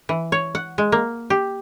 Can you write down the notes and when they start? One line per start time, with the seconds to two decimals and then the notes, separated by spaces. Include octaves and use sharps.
0.09 E3
0.32 C#5
0.55 F#5
0.78 G#3
0.92 A#3
1.30 G4